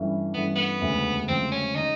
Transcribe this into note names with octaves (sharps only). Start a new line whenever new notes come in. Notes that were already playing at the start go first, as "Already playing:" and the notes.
Already playing: G2 E3 A3 C#4
G2 E3 A3 B3 C#4
B3
E1 D2 C#3 F3
E1 D2 C#3 F3 C4
C#4
C#3 D#4